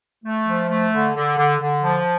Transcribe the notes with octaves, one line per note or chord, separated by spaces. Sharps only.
A3
F3
A3
D3
D3
D3
D3
F3